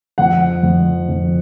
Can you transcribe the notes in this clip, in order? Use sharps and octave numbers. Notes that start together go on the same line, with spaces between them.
F2 F#5
F2
F2